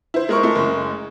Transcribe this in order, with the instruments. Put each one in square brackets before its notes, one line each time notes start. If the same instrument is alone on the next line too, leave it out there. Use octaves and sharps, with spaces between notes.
[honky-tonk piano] E4 C5
[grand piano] G#3 A#4 C#6
[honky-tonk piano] A3 E4
F#1